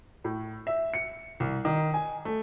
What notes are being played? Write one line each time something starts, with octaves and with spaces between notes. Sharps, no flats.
A2
E5
C#7
C2
D#3
G#5
A3